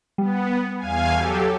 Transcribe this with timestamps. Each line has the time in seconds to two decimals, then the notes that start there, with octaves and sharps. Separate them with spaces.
0.18 G3 B3
0.78 E2 F5 G#5
1.13 F#3 G4 A4